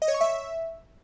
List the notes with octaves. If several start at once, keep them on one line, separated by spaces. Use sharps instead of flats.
D#5
C#5
C#6
E5